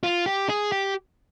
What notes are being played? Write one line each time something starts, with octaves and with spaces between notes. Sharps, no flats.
F4
G4
G#4
G4